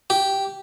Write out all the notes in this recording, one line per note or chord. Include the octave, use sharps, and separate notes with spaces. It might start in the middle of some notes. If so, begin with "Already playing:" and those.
G4